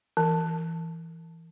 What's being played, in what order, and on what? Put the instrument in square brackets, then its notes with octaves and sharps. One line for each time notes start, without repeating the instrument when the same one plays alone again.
[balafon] E3